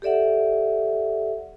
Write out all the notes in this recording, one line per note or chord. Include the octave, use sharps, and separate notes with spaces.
G4 A4 D5 E5 F#5